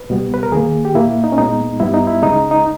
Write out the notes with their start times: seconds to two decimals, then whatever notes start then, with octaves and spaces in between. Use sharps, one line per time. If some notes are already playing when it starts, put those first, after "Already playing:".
Already playing: B4
0.10 C#2 B2 G3 B3
0.34 B4
0.43 A#4
0.52 D#2 D#3 A#3 G#4
0.85 G4
0.95 A#2 A#3 E4
1.24 D#4
1.32 C#4
1.38 A#2 G#3 B3 D#4
1.80 G2 G3 B3 E4
1.94 D#4
2.07 E4
2.22 C#2 C#3 G#3 D#4
2.51 D#4